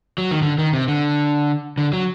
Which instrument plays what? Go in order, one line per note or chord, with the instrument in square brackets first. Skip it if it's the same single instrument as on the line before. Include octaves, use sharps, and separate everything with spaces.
[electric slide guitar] F#3
D#3
D3
D#3
C3
D3
D3
F#3